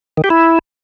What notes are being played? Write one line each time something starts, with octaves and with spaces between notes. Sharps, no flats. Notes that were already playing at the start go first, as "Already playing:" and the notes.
D#3
G4
E4